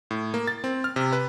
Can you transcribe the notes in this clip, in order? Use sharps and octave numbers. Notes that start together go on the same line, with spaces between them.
A2
A#3
A6
C4
F6
C3
B4